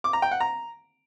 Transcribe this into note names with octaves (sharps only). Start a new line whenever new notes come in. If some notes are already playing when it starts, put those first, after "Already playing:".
D6
A#5
G5
F#5
A#5